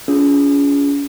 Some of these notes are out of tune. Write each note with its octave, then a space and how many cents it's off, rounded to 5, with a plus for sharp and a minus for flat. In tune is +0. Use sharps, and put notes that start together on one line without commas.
C#4 +35 F4 +0 G#4 +0